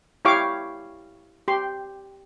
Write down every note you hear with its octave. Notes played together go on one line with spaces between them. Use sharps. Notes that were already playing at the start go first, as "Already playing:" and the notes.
E4 G4 C#5 F5 C#6 D6
G4 C6